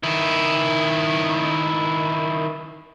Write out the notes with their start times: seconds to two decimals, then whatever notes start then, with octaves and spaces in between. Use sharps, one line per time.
0.03 D#3 E4